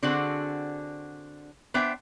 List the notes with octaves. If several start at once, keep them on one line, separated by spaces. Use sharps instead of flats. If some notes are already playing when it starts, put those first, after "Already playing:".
D3 C4 D4 F#4 G#4 F#5
B3 D4 C5 E5 G5